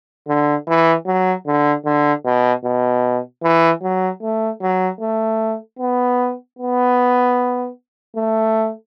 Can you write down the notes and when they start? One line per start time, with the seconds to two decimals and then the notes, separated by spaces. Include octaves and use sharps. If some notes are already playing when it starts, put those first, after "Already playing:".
0.28 D3
0.67 E3
1.06 F#3
1.46 D3
1.85 D3
2.25 B2
2.64 B2
3.43 E3
3.83 F#3
4.22 A3
4.62 F#3
5.01 A3
5.79 B3
6.59 B3
8.16 A3